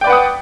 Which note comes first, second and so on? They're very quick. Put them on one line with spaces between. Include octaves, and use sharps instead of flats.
G5 D5 B4 F#5 D#6